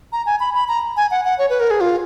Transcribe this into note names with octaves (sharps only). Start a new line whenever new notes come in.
A#5
G#5
B5
B5
A#5
G#5
F#5
F#5
C#5
B4
A#4
G#4
F4